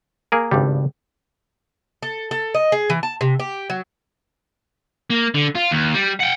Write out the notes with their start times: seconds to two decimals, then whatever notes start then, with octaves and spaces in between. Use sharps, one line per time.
0.32 A#3 G#4 A#4
0.51 G#1 G2 C#3 G3
2.02 A4
2.31 A4
2.54 D#5
2.72 G#4
2.90 E3
3.03 A5
3.21 C3
3.40 G4
3.70 F#3
5.10 A#3
5.34 D3
5.55 F4
5.71 D#2
5.94 G3
6.20 F#5 G5